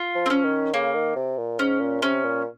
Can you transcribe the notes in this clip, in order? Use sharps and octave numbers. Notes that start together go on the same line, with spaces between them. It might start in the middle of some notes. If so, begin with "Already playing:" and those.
Already playing: F4
F3
C4
C#4
D#3
C#3 A#3
D#3
C3
A#2
G#2 C#4
A#2
C3 C#4
A#2